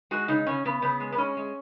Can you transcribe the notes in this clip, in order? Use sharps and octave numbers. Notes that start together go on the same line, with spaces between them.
G#3 F#4
C#3 D#4
C#3 C#4
C#3 B3
C#3 B3
G#3
B3
G#3 C#4
G#3